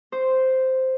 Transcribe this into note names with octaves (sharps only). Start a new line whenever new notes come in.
C5